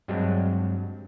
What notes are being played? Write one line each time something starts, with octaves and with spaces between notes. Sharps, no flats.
G2 F#3 G#3 C4 D4